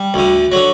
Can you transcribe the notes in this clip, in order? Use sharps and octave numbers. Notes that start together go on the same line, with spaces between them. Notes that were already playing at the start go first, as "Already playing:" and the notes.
Already playing: G3
D2 D3
D3 F#3